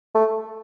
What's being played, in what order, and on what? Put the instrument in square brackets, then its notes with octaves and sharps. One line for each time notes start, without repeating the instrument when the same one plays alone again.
[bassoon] A3